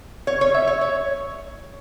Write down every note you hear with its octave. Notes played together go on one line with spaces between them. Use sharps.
C#5
C#5
E5
C#5
C#5